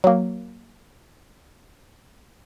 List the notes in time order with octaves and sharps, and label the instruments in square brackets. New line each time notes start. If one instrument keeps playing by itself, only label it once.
[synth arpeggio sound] F#3 A#3